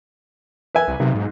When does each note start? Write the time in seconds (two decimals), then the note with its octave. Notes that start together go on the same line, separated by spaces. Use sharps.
0.75 B4 E5 G#5
0.88 C2
1.00 B1 C3
1.14 G#2